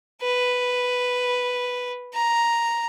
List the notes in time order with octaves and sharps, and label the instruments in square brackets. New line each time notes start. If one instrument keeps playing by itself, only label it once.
[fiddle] B4
A#5